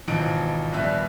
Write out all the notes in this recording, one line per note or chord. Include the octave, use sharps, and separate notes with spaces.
G#1 B2 E3 F3 D#4 D7
A#1 D#2 G3 B3 E5 F#6